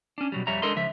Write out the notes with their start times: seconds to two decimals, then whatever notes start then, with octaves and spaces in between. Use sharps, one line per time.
0.18 C#4 D4
0.32 B2 F#3 G3
0.47 F2 G3 C#5 E5 A#5
0.62 G#3 D4 A4 A#4 D#5 C6
0.76 C#2 F3 E5